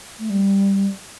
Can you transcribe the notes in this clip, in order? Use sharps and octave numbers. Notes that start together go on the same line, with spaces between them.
A3
G3